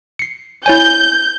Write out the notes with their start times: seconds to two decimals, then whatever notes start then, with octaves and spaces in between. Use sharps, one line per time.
0.19 C7 C#7
0.66 E4 C#5 G#5 G6